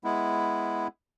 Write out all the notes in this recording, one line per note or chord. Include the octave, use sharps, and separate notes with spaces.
G#3 B3 E4